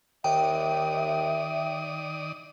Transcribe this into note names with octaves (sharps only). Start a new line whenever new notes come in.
D#2 D#3 D5 E5 G5 D#6